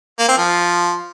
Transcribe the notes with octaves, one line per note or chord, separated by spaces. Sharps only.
A#3
C4
F3